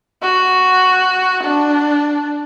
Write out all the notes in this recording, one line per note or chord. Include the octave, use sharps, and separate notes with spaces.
F#4
D4